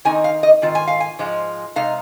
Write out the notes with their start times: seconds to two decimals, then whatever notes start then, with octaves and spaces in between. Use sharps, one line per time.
0.05 D#3 C4 D#4 G#5
0.24 F5
0.43 D#5
0.62 G#2 D#3 C4 F4
0.75 G#5
0.88 F5
1.00 G#5
1.19 G#2 F3 G#3 F4
1.76 C3 G#3 D#4 F5